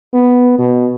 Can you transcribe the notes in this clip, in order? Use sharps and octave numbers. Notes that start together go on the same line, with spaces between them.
B3
B2